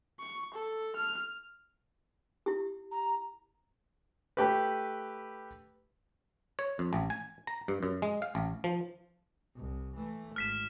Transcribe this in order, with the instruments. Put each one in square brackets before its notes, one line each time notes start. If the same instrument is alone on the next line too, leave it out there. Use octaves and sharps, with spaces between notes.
[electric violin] C#6
A4
F6
[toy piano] E4 G4
[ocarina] A#5
[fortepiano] A3 G4 B4
[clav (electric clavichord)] C#5
F2
A1
G#5
A#5
G2
F#2
G#3
F5
A1
F3
[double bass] C2
E3 A3
[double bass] G#1 [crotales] F6 B6 E7